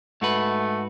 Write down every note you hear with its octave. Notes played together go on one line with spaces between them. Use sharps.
G#2 A3 F#4 B4